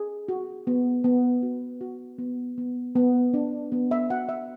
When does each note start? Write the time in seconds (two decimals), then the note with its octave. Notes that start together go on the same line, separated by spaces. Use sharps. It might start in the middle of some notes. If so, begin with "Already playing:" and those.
Already playing: G#4
0.28 F#4
0.67 B3
1.04 B3
1.43 F#4
1.81 F#4
2.18 B3
2.58 B3
2.96 B3
3.34 D4
3.72 B3
3.91 E5
4.10 F#4 F#5
4.29 E5